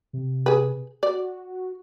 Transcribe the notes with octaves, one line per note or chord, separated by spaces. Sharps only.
C3
G#4 B4
F#4 D5